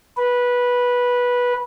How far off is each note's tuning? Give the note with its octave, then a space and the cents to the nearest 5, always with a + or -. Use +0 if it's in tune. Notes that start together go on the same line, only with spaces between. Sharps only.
B4 -15